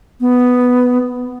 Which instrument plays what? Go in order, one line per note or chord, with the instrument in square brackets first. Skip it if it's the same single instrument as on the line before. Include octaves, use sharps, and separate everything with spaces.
[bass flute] B3